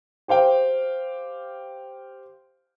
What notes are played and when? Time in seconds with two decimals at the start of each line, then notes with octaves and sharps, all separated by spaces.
0.28 G4 C5 F5 G5